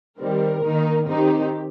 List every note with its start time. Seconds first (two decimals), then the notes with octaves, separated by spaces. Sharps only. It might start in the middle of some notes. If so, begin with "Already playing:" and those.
0.20 D#3 G3 C4 A#4
0.64 D#3 A#3 D#4
1.08 D#3 C4 D#4 G4